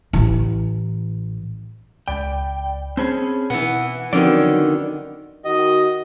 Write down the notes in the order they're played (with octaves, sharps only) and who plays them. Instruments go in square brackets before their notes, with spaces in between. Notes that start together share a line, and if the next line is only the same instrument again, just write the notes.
[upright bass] A1 E3
[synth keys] C#2 D5 B5 [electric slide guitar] G5
[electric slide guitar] C4 C#4 G#4 [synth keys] C5 A5 B5
[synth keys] B2 [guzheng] E3 B3 [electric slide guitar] F#5
[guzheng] D3 D#3 [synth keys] F3 C4 F#4 [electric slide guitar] F#3 C#4 D5
[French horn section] D#3 F#4 [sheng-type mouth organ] D#5